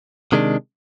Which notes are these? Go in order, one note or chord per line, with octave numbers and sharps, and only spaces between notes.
C3 D#3 G#3 D4